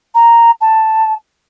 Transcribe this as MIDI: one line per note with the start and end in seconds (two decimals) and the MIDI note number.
0.15 0.51 82
0.61 1.14 81